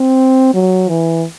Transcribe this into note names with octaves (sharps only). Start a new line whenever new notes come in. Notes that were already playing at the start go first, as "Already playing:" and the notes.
Already playing: C4
F#3
E3